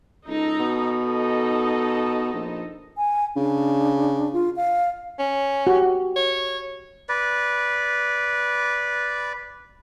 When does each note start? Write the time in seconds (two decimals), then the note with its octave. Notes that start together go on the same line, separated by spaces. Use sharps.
0.28 C#2 D#4 A4 A#5
0.60 B2
1.00 D#4 A4 D#5
2.34 A#1
2.97 G#5
3.36 C#3 D4
4.33 F4
4.56 F5
5.19 C#4
5.67 F#4 G4
6.16 C#5
7.09 B4 D5